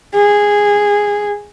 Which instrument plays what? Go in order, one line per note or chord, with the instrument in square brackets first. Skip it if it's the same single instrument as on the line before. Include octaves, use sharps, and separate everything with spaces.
[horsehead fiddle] G#4